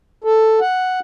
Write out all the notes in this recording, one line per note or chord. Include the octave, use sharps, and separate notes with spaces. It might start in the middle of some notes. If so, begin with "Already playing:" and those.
A4
F#5